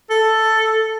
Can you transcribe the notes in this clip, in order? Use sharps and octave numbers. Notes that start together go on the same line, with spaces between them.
A4